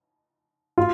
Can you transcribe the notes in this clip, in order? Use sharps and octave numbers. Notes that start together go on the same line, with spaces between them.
F4